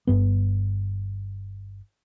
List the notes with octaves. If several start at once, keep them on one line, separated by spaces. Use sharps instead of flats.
G1 G2 B3